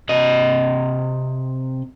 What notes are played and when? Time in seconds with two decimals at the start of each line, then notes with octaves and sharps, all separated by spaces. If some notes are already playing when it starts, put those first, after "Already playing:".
0.09 C3 D#5